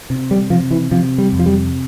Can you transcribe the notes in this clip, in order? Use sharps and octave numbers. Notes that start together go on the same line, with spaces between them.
C3
G3
C3 F3
E3
C3 F3
G3
F2
F3
G3